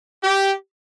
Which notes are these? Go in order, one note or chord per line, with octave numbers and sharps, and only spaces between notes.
G4